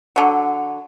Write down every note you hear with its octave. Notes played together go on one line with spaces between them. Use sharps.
D3 F#3